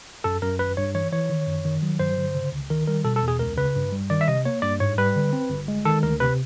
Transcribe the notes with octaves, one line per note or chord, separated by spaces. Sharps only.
F#2 A4
F#2 A#4
G#1 B4
G2 C#5
E3 C#5
E3 C#5
D#3
F#2
D#3
F#3
G2 C5
D3
C#3
C#2
D#3 A#4
G3 A#4
B2 A4
A4
E2
G#4
C#2 A#4
C#3 B4
G2
G3
D#3 D5
E5
C3 D#5
A#3 C#5
G2 D5
G#2 C#5
G3 B4
D3
C4
G1
G#3
D#3 A4
D2 A#4
C3 B4